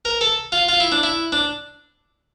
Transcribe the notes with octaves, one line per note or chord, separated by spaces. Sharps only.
A#4
A4
F4
F4
E4
D4
E4
D4